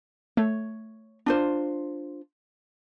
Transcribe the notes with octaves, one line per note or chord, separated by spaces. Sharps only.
A3 C#5
D4 F4 C5